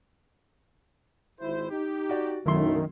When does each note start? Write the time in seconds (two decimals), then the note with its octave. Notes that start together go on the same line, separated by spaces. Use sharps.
1.39 G#1 E4 C5
1.71 D#4 G4
2.09 F#4 D5
2.46 B1 F#2 D3 D#3 A3 E4 C6